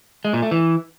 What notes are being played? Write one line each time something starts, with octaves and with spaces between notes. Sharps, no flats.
G#3
A#2
A3
E3